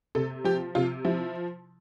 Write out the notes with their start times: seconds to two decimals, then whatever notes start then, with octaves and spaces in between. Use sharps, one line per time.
0.15 C3 A4
0.44 F3 G4
0.75 C3 F4
1.05 F3 E4